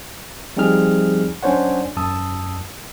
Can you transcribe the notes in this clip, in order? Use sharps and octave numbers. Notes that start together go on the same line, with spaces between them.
F3 G3 C4 D#4 G#4 F6
F#3 C#4 D4 C5 C#5 F#5
F#2 A5 D#6 E6